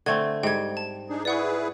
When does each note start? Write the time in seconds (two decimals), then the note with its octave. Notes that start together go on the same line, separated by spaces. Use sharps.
0.06 D3 A3 C4 G#6
0.43 G#2 G3 G5 G#6
0.77 A5
1.09 D4 D#4 G#4
1.25 E4 G#4 B4 D5 F#5 C#6